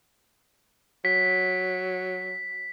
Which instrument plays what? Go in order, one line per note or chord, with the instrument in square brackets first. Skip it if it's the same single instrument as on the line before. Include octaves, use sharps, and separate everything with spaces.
[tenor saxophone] F#3 [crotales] B6